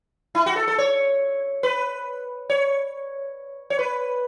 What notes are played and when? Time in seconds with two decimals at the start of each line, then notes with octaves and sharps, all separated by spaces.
0.35 E4
0.46 F#4
0.56 A4
0.68 A4
0.78 C#5
1.63 B4
2.50 C#5
3.70 C#5
3.79 B4